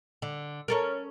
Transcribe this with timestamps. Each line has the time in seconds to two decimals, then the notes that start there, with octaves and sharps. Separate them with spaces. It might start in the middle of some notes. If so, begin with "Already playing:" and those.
0.22 D3
0.68 C#4 A4 A#4